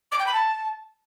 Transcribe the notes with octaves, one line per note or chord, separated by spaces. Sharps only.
D6
G5
B5
A5